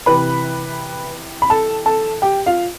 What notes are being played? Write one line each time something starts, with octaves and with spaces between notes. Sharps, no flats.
C3 E3 B4 B5
B5
A4 A5
A4 A5
G4 G5
F4 F5